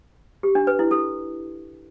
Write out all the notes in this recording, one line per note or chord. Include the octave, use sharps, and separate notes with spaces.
G4
D4
B4
E4
A4